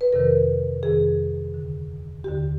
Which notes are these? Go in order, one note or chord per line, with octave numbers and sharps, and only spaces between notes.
B4
F2 C3 D#3 A#4
F2 C3 D#3 G#4
D#2 D3
D#2 D3 G4